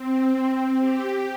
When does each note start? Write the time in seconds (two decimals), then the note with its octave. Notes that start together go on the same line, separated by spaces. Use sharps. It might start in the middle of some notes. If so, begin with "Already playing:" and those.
Already playing: C4
0.79 G4